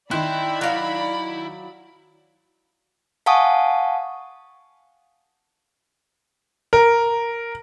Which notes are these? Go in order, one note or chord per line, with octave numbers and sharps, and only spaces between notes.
D#3 C4 E4 D5 B5 F#6
F#3 F5
F5 F#5 G#5 A5 C#6 D#6
A#4